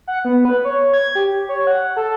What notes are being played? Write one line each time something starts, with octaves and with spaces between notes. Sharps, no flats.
F#5
B3
B4
C#5
G#6
G4
C#5
F#5
A4